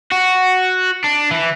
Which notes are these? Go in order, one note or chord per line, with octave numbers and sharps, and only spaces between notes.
F#4
D4
E3